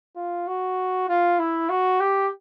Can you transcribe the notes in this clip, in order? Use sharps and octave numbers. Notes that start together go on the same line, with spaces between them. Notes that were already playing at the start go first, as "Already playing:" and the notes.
F4
F#4
F4
E4
F#4
G4